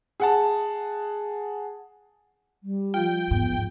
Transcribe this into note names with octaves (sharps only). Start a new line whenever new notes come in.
G#4 F#5 A5
G3
F3 F4 G5
E2 G#2 B3